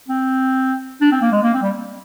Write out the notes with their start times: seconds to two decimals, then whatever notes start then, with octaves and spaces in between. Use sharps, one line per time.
0.08 C4
1.01 D4
1.12 C4
1.21 A#3
1.32 G#3
1.43 A#3
1.53 C4
1.62 G3